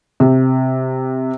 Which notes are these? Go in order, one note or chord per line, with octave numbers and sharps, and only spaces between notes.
C3